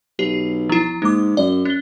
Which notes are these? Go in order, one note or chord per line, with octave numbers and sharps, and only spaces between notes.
B1 G4
F3 E4
G#2 A#3 D6
F#2 D5
C#4 G7